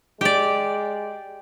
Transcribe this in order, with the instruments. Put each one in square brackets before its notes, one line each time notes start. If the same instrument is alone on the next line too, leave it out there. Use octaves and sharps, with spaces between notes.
[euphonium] G#3 [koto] G4 D5